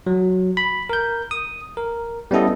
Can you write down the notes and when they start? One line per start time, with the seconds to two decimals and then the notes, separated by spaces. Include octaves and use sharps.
0.07 F#3
0.57 B5
0.90 A#4 G6
1.31 D#6
1.77 A#4
2.31 G3 B3 C#4 E4 A4 D#5